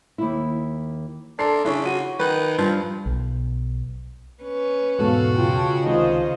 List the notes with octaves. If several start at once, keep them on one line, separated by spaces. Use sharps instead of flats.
D#2 E4
D4 A4 A#4 C6 C7
C#3 D4 E4 G#4 C#5
F#4 D#7
D#3 B4
G2 F3
B1
C#4 B4
E2 G#2 B2 F#4 A4 F5
C#3 C#4 F4 G5 A5
C#2 C3 D#3 F4 C5 D#5